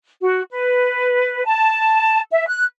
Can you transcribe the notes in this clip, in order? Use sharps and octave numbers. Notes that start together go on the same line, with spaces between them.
F#4
B4
A5
E5
F#6